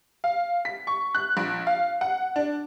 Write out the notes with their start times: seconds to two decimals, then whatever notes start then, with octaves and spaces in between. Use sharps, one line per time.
0.24 F5
0.65 B6
0.87 C#6
1.15 F#6
1.37 A#1
1.67 F5
2.01 F#5
2.36 D4